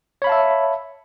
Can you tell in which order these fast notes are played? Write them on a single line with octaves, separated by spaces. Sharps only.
C#5 B5 F5 A5 E5